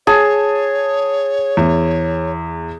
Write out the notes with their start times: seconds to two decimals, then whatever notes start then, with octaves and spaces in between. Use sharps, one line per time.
0.07 G#4 C#5 A5
1.57 E2